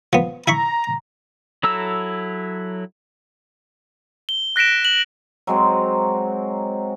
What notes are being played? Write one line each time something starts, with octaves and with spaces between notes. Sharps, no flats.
F3 B3
E4 A#5 B5 C#6
F#3 E4 A4 A#5 E6
G7
F#6 A#6 B6 D7 E7
F#7
F#3 G#3 C4